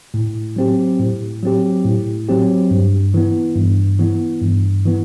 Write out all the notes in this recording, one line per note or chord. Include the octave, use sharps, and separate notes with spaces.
A2
F#3 C4 G4
A2
F#3 C4 G4
A2
F#3 C4 G4
G2
E3 B3
G2
E3 B3
G2
E3 B3